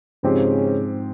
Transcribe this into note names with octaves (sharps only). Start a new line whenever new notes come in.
G#2 C#3 F3 C4 G4